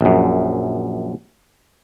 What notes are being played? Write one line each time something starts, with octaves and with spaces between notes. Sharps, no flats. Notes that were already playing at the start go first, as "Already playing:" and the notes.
A#1 F#2